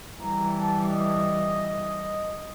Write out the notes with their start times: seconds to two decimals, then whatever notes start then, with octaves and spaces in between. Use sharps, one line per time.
0.22 E3 G3 A#5
0.59 A5
0.91 D#5